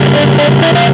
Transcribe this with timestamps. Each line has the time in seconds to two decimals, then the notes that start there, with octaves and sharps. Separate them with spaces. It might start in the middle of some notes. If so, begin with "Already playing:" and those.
Already playing: C#3 G3 A#3
0.15 D4 D5
0.39 D4 D5
0.62 E4 E5
0.75 F5